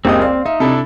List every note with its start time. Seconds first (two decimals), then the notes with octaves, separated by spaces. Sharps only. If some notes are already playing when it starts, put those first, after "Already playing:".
0.05 F#1 C#2 A#3 C4 G4 D#5 D#6
0.21 D5 F5 C6
0.46 D#4 E5
0.60 C3 D4 E4 A4 B5